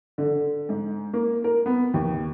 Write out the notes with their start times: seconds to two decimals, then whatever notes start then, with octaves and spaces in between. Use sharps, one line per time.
0.18 D3
0.69 G#2
1.13 A#3
1.44 A#4
1.66 B3
1.94 D#2